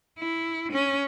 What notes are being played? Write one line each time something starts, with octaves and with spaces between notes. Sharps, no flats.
E4
C#4